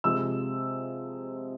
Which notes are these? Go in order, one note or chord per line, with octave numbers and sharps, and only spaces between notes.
C3 F3 G#3 E6